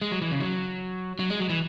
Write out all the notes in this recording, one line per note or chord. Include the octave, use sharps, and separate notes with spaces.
G#3
F#3
E3
C#3
F#3
F#3
G#3
F#3
E3